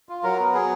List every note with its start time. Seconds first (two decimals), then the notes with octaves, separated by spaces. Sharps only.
0.09 F4
0.23 F#3 A#4
0.39 B3
0.54 F#3 G#4